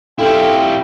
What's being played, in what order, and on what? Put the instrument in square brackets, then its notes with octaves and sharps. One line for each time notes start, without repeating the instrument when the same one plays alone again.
[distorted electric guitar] E4 G4 [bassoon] F4 [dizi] A4 [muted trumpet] G5